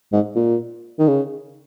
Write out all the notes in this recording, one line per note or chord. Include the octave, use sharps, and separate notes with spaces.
G#2
A#2
D#3
C#3